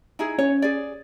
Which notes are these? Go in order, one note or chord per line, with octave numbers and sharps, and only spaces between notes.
D#4 E4 G#4
C#4 C#5
G#4 D5